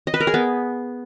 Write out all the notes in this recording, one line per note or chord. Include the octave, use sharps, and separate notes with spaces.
D#5
B4
A#4
G#4
B3